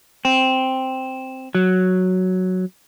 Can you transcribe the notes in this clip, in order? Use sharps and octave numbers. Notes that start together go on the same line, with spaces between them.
C4
F#3